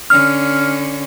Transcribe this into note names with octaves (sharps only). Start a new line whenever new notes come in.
D3 C#4 F6